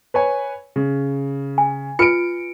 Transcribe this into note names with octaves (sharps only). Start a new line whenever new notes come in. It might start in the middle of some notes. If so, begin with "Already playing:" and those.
B4 C#5 G#5
C#3
G#5
F4 B4 C#7 D7